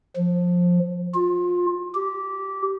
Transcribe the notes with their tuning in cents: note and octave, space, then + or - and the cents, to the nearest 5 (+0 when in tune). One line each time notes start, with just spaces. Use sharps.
F3 +15
F4 +25
G4 -15